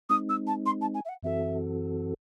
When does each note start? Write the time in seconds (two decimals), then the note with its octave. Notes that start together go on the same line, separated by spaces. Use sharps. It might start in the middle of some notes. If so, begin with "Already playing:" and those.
0.09 G#3 C4 D#4 D#6
0.29 E6
0.47 A5
0.66 C6
0.81 A5
0.94 G#5
1.05 E5
1.08 F#5
1.23 F#2 E3 C4 F#4 A4 E5